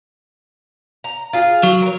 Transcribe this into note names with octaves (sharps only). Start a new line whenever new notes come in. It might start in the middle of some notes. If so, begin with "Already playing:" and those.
A#5
F4 G#4
F#3
A#4 C#5